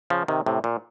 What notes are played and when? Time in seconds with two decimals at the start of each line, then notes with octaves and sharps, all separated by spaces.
0.10 C#3 F3
0.28 C3 D#3
0.46 A2 C3
0.64 A#2